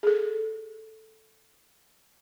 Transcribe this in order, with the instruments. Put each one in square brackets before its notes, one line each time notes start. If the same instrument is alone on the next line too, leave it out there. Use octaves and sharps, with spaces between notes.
[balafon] G#4 A4